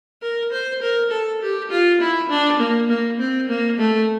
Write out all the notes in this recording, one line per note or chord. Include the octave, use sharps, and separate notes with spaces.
A#4
C5
A#4
A4
G4
F4
E4
D4
A#3
A#3
C4
A#3
A3